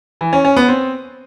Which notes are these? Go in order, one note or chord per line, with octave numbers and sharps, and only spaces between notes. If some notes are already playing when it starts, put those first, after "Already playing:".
E3
C#4
C#4
B3
C4